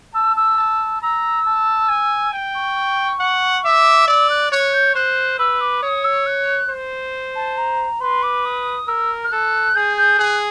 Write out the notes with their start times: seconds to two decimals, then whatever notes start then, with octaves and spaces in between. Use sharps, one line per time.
0.14 A5 E6
0.36 E6
0.58 A5
1.02 A#5 E6
1.46 A5
1.89 G#5
2.33 G5
2.55 C#6
3.20 F#5
3.64 E5 D6
4.07 D5 E6
4.30 F#6
4.51 C#5 F#6
4.73 G6
4.95 C5 F#6
5.39 B4 E6
5.61 D6
5.83 C#5 D#6
6.04 E6
6.26 F#6
6.69 C5
7.35 A5
7.57 A#5
8.00 B4 C6
8.22 D6
8.45 D#6
8.87 A#4 E6
9.24 F6
9.32 A4 F#6
9.75 G#4 G6
9.97 G6
10.19 G#4 F#6